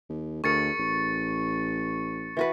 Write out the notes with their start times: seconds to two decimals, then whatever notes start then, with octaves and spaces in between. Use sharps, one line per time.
0.10 D#2
0.44 D2 G#4 A#4 C#6 A6 C#7
0.79 A1
2.37 E3 F#4 B4